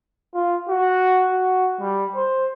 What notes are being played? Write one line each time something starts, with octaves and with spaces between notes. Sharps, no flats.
F4
F#4
F#4
G3
C5